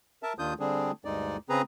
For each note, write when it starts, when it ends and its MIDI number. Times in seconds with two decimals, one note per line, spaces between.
0.23 0.33 70
0.23 0.33 76
0.23 0.33 81
0.39 0.54 39
0.39 0.54 51
0.39 0.54 62
0.39 0.54 65
0.39 0.54 87
0.39 0.54 91
0.59 0.91 50
0.59 0.91 55
0.59 0.91 60
0.59 0.91 62
0.59 0.91 68
1.05 1.37 38
1.05 1.37 43
1.05 1.37 56
1.05 1.37 63
1.05 1.37 74
1.49 1.62 49
1.49 1.62 60
1.49 1.62 68
1.49 1.62 71
1.49 1.62 82